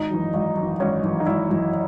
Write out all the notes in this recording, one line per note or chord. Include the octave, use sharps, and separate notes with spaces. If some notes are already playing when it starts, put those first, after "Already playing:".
Already playing: G#1 D#4
F#2 E3
G#1
F#2 E3
G#1 C#4
F#2 E3
D#4
G#1 E4
F#2 E3